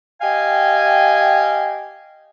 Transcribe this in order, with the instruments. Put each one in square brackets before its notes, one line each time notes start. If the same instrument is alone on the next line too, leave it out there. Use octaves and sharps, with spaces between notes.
[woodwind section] G4 D#5 F5 G5 G#5